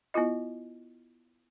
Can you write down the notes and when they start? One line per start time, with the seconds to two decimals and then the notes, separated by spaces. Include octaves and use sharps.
0.14 B3 E4 F4 D#5